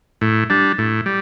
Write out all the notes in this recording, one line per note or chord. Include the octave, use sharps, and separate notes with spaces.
A2
G3 D4
A2
G3